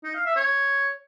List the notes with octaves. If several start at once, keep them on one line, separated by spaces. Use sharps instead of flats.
D#4
F5
E5
C#5